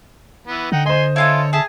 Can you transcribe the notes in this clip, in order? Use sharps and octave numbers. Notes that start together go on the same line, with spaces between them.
E3 B3
D3 D#4 F#5 G5
C5 D#5 G#5 C6
E4 F4 A4 C#5 G#5
G#4 E5 A5